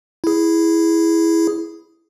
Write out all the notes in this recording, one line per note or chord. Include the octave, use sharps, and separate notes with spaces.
E4 G#4